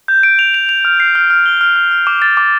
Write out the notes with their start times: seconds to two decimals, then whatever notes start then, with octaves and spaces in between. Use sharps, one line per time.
0.08 G6
0.23 D7
0.39 F7
0.54 F7
0.69 F7
0.85 F6
1.00 C7
1.15 F6
1.30 F6
1.46 G7
1.61 F6
1.76 F6
1.91 F6
2.07 D6
2.22 A6
2.37 D6